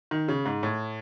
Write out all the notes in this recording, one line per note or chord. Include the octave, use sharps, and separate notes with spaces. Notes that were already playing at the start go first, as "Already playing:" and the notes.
D#3
C#3
G#2
A2